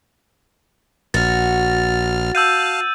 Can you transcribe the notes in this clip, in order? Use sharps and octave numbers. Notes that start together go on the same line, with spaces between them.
A#1 F#4 F6 A6
F5 A5 E6 G6 D#7